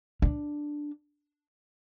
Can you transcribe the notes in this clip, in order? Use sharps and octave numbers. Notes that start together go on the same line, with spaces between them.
D4